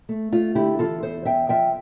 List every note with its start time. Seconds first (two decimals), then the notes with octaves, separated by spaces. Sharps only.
0.09 A3
0.32 A3 F4
0.55 D3 E4 G4
0.79 E3 F4 A4
1.02 E2 A4 C5
1.25 E2 E5 G5
1.49 F3 E5 G5